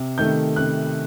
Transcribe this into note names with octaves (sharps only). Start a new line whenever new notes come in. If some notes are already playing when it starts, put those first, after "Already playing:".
Already playing: C3
D#3 A3 G6
C3 F#6